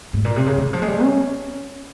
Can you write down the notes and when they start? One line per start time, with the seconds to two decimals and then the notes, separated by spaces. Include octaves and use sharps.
0.13 G#2
0.25 A#2
0.36 C3
0.46 C#3
0.58 D#3
0.73 F3
0.82 G#3
0.88 G3
1.02 C#4